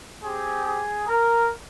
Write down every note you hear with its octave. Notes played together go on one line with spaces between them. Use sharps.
C4 G4 G#4
G#4
A#4